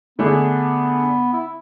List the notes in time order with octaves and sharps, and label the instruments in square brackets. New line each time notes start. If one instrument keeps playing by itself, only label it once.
[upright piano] D3 A3 D4 G#4 [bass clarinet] B3
[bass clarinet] E4